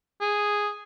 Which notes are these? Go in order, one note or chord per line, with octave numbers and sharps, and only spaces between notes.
G#4